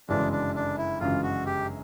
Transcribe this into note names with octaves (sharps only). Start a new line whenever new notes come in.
G1 F#2 C#3 E3 G#3 D4
D4
D4
E4
G1 F#2 C#3 E3 G#3 F4
F#4
G4